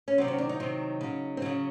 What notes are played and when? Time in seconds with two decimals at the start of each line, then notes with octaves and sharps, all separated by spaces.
0.08 C#4
0.18 C3 D#3 F#3 C4
0.28 C#4
0.38 D4
0.49 D#4
0.60 C3 D#3 F#3
1.01 C#3 F#3
1.37 C4
1.42 C#3 F#3 C#4